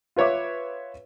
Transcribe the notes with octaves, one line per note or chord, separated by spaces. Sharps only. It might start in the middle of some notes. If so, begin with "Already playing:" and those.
F4 B4 C#5 E5 D6